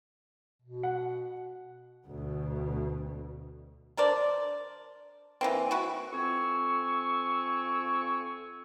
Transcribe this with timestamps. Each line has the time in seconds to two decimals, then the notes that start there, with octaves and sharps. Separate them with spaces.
0.62 B2
0.83 F#5
2.07 D2 B2
3.97 D4 A#4 C5 D5
5.41 E3 A#3 C4
5.71 E4 F#4
6.12 F2 C4 G#5 C#6 E6